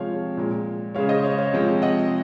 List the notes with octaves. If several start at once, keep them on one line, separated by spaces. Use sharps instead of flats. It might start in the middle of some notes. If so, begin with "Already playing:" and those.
Already playing: C3 F3 G#3 C#5 F5
A#2 G#3
C#3 G#3 C#5 F5
C5 D#5
C#5 F5
C#5 F5
C3 F3 G#3
D#5 F#5